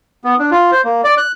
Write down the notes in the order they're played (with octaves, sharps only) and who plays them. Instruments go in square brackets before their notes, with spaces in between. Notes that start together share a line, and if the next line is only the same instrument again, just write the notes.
[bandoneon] B3
D4
F4
C5
A#3
D5
F#6